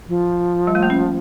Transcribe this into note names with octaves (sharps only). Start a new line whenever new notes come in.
F3
G3
A3
A#3
C#4